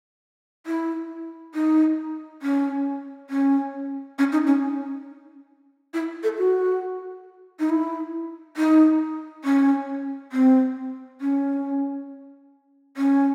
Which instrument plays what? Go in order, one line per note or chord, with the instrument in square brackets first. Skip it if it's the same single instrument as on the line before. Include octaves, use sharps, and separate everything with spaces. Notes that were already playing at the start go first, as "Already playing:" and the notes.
[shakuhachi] E4
D#4
C#4
C#4
C#4
D#4
C#4
E4
A4
F#4
D#4
E4
D#4
C#4
C4
C#4
C#4